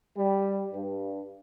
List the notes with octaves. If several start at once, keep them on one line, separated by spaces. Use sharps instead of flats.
G3
G2